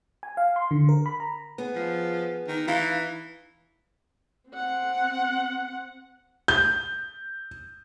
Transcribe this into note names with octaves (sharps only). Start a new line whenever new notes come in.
G#5
F5
C6
D3
A#4
B5
A#5
B3 G#4
F3
D#3
E3 D#4 F5 A#5
C4 F#5
G6